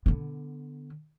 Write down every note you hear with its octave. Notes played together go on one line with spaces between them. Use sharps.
D3 B3